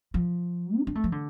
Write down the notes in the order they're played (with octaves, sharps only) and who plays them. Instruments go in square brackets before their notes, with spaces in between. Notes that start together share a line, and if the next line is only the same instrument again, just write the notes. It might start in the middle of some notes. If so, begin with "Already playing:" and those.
[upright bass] F3
E4
D4
A3
F3
D3